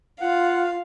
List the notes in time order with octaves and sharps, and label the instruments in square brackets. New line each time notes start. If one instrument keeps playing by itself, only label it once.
[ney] F4 [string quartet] F5 [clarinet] F#5